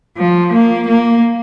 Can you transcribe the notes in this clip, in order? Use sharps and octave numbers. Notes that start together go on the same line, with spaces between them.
F3
A#3
A#3